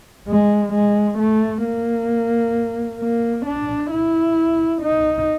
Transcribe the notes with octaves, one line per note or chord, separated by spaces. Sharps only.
G#3
G#3
A3
A#3
A#3
D4
E4
D#4